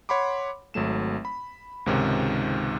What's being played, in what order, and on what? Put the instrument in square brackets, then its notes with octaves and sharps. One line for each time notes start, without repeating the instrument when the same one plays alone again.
[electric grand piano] C#5 F#5 B5 C6 D6
G#1 F#3 A3 E7
B5
C#2 G#2 C3 D#3 C#4